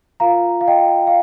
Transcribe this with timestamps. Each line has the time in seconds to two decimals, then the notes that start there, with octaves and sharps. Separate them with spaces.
0.20 F4 A#4 F5 A#5
0.61 F5
0.67 D#5 G5
1.07 F5